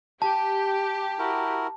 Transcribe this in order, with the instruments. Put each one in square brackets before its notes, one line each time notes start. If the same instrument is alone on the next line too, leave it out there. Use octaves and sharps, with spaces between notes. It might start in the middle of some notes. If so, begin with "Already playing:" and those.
[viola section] G4 [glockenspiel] A5
[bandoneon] E4 F#4 A#4